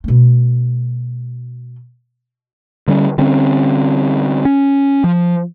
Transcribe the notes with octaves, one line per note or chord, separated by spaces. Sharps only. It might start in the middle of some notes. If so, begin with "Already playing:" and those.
B2 A3
D3 G3 C4 C#4
D3 G3 C4 C#4
C#4
F3